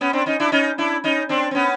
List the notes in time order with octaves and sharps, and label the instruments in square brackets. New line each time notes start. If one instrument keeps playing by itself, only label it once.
[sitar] B3 C#4
C4 D4
C#4 D#4
D4 E4
C#4 D#4
D4 E4
C#4 D#4
C4 D4
C4
B3 C#4